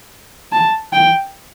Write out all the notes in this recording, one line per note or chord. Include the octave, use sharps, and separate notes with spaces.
A5
G5